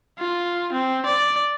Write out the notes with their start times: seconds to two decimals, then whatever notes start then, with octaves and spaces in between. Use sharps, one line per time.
0.19 F4
0.72 C4
1.06 D5